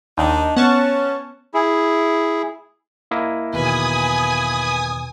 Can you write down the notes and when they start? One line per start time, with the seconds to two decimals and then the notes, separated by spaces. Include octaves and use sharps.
0.18 D#2 D4 D#4
0.56 B3 C#4 F#5 A5 C#6
1.54 E4 G#4
3.11 A#3 E4 D#5
3.54 E2 B2 D#3 B4 G#5 D#6